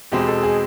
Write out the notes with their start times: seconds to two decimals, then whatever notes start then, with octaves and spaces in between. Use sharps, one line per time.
0.12 E2 B2 G#3 C4 G4
0.27 A4
0.43 G#4